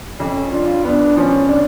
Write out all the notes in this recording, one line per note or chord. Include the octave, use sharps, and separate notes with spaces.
F2 C#4
D4 F4
B3 D4
F3 C#4
D4